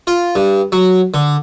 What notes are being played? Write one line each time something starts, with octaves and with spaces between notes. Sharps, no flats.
F4
G2
F#3
D3